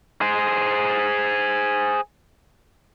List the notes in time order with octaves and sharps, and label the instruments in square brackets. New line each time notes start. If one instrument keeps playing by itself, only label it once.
[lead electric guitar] G#4 C5